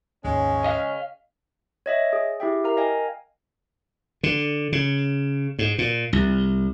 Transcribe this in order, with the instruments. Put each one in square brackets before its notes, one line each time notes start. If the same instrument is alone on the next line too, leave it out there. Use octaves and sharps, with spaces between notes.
[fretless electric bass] G#1 D#2 [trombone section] C#3 C#4 [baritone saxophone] G#3
[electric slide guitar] D#5 F5
[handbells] C#5 D#5 E5
G#4
E4 G4 E5 G5
A#4 F5 A#5
D#5 F5 G5 G#5
[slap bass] D3
C#3
G#2
A#2
C2